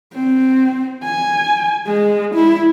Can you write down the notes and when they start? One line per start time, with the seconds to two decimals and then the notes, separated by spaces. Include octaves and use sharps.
0.14 C4
1.04 G#5
1.87 G#3
2.35 E4